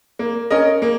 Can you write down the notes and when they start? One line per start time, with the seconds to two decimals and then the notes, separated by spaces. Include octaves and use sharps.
0.19 A#3
0.51 C#4 A#4 D#5
0.82 A#3